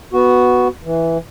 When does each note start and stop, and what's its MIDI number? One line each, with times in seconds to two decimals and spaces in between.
0.13 0.68 59
0.13 0.68 66
0.84 1.18 52